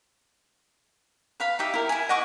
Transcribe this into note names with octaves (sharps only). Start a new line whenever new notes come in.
B4 F5 B5
D#4 G4 E5
E4 A#4
E4 G#5
D#5 F#5 C#6 D6